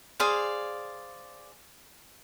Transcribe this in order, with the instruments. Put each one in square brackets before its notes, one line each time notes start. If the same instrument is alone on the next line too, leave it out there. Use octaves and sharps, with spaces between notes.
[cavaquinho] G#4 C5 D5 F5